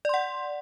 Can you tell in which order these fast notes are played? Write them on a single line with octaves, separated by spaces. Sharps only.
D5 C6 F#5